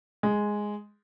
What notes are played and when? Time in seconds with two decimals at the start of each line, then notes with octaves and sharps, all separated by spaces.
0.23 G#3